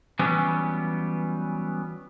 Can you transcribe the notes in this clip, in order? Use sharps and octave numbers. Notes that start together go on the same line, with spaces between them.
E3 F#3 G3 B3 C#4